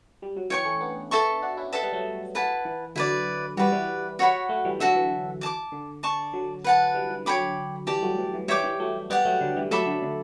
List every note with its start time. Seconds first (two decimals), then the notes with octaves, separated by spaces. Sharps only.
0.22 G3
0.36 F#3
0.50 E3 C#5 G5 C#6
0.65 A3 C#4
0.81 B3 D4
1.11 A4 E5 A5 C#6
1.42 D4 F#4
1.57 C#4 E4
1.73 B3 D4 A4 E5 A5
1.83 G3 B3
1.93 F#3 A3
2.35 E4 B4 F#5 A5
2.65 E3
2.96 D3 F#3 E4 B4 D5
3.57 E3 G3 F#4 B4 D5
3.72 E3 G3
4.19 F#4 C#5 F#5 B5
4.49 F#3 A3
4.65 E3 G3
4.79 D3 F#3 F#4 A4 E5
4.95 E3
5.41 D5 A5 D6
5.72 D3
6.03 D5 A5 C#6
6.33 D3 F#3
6.64 B4 F#5 A5
6.94 E3 G3
7.10 E3
7.25 D3 F#3 C#5 G5 B5 D6
7.87 E3 G3 G4 D5 A5
8.02 F#3 A3
8.18 E3
8.34 E3
8.48 E3 G3 C#5 E5 G5 D6
8.64 E3 G3
8.79 F#3 A3
9.10 G3 B3 G4 D5 F#5
9.25 F#3 A3
9.41 D3 F#3
9.56 E3 G3
9.71 F#3 A3 A4 E5 B5 D6
9.86 D3 F#3
10.02 D3